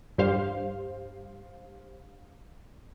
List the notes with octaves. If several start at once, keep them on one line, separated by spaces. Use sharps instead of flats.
G2 G4 C5 F5